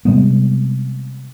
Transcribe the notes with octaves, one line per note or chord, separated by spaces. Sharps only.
C3 G3 G#3 B3